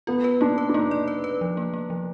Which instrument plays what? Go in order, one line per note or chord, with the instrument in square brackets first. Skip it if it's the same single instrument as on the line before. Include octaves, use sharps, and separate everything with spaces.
[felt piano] B3 [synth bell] F4
[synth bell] B4
[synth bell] A#3 [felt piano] D4
[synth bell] B4
[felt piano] D4
[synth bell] A#3 [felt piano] D#4
[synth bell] D5
B4
B4
F3
A#3
A#3
F3